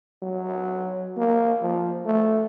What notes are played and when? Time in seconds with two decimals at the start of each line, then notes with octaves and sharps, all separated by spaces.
0.23 F#3
1.17 A#3
1.63 F3
2.06 A3